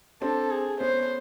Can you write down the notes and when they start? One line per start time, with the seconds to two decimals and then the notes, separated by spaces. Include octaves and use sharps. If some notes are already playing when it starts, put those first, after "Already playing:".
0.21 C4 D4 A4
0.51 G#4
0.80 B3 C#4 C5